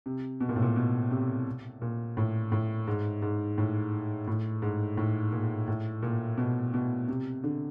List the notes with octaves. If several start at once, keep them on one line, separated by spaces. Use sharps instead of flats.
C3
B2
A#2
A2
A#2
B2
C3
A#2
A2
A2
G#2
G#2
A2
A2
G#2
A2
A#2
A2
A#2
B2
B2
C3
D3